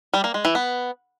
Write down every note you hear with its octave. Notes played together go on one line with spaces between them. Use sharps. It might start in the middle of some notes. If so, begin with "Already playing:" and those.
G3
A#3
G#3
E3
B3